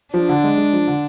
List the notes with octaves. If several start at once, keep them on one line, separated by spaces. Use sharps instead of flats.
F3 D4
D3
G#3
G#3
F3
D3